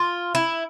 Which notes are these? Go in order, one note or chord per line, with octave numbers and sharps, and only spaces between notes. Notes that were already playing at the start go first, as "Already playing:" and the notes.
Already playing: F4
E4